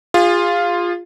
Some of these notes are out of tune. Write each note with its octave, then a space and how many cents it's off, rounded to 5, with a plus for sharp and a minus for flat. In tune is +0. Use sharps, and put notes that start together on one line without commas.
F4 +0 G#4 -35